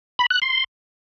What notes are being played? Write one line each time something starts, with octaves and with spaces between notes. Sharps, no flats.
B5
F#6
C6